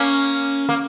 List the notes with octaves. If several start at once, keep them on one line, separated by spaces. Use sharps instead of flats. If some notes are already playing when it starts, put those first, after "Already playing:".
Already playing: A#3 C#4
A#3